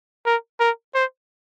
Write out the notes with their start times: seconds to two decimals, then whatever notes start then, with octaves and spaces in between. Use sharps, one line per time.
0.26 A#4
0.60 A#4
0.95 C5